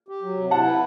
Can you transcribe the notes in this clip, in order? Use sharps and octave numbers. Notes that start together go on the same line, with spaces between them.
G4
F#3
C3
E4 F#5 A5
B4